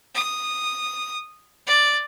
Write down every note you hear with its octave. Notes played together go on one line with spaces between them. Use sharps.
D#6
D5